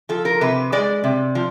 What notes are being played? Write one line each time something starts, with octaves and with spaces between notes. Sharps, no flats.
F3 A4
A#4
C3 B4
G#3 D5
C3
F3